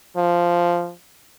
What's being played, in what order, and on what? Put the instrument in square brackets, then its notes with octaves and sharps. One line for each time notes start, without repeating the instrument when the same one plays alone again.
[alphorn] F3